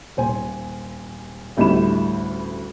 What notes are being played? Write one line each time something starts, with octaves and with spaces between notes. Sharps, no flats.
D#1 C5 G#5
A1 D2 G3 E4 B5 E7